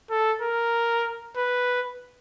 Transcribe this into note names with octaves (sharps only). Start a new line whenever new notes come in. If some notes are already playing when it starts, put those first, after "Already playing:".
A4
A#4
B4